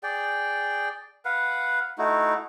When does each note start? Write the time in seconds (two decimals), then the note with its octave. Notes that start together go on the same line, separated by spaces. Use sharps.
0.03 G#4 D5 G5
1.25 B4 F5 F#5
1.98 A3 D#4 E4 F#4